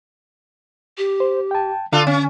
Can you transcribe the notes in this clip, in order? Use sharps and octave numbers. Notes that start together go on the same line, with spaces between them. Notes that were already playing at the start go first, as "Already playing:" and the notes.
G4
C5
G5 A5
D3 D4 F4 A4 F5
C#4